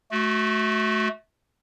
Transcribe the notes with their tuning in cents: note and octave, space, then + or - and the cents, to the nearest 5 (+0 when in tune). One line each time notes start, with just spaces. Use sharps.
A3 -25 F#4 +0